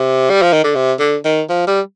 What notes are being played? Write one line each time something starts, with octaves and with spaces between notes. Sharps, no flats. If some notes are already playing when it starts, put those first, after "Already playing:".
Already playing: C3
G3
F3
D#3
D3
C3
D3
D#3
F3
G3